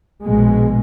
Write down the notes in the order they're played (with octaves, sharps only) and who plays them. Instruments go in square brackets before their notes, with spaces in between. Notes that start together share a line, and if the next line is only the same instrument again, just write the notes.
[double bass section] A#1 B2 G#3